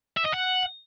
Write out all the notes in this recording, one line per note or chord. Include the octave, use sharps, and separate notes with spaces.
E5
D#5
F#5